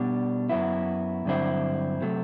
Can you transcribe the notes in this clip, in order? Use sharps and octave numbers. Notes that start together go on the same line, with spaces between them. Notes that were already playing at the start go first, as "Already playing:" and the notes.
Already playing: B2 G3 D4
F#2 F#3 B3 E4
G2 D3 F#3 C4 E4
C3 F#3 A3